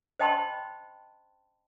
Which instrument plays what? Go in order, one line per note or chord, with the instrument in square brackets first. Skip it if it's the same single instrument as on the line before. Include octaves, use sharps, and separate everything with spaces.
[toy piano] C5 D#5 G5 A5 B5 C6